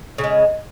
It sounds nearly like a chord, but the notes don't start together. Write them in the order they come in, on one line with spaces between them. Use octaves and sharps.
C#3 F#3 G#3